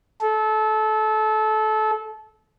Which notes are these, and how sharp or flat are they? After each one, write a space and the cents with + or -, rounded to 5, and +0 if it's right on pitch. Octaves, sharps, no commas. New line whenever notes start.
A4 -25